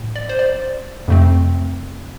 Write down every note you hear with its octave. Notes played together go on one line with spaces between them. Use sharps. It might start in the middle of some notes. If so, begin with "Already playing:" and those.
Already playing: A2
D5
C5
D5
F2 C3 A3 C4